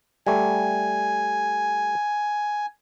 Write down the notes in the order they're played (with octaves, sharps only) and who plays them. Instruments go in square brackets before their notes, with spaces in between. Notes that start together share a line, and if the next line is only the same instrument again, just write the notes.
[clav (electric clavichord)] G3 A3 [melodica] G#5